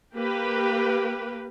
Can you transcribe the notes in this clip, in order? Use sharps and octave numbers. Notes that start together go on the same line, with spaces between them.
A#3 G4 B4